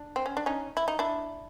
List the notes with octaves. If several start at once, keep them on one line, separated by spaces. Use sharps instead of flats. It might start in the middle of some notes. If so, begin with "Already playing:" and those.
Already playing: D4
C4
C#4
D4
C#4 D#4
E4
D#4
D4 E4